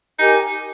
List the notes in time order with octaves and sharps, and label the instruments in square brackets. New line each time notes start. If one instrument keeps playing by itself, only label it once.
[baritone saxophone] D#4 [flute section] G4 A#4 D#5 G#5